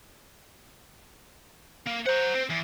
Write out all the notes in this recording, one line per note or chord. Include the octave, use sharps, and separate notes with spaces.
A#3
C5 F#5 A#5
C4
E2